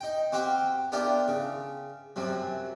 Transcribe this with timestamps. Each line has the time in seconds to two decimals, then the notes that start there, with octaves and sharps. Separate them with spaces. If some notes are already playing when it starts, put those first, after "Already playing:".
0.01 D#4 G5
0.32 C4 F#4 G4 F5 G5
0.92 B3 D4 E4 F4 G4 A#4
1.28 C#3
2.16 F#2 C3 F#3